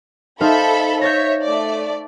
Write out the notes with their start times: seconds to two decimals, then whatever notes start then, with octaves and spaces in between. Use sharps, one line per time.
0.41 D#4 A4 C5 E5 F5 B5
1.01 C#5 E5 G6 A6 A#6
1.43 A3 D5